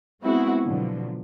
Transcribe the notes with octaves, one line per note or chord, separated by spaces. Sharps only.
G#3 B3 C4 E4 F#4 G#4
B2 D3 F3 F#3